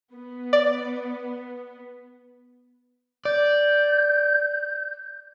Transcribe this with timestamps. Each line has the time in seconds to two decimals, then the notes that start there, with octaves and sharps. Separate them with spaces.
0.13 B3
0.53 D5
3.25 D5 G6